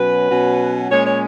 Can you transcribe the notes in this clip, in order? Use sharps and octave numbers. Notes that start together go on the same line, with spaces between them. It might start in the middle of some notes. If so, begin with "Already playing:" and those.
Already playing: B2 F#3 C#4 B4
B2 F#3 C#4
A#2 G#3 C#4 C#5
C#5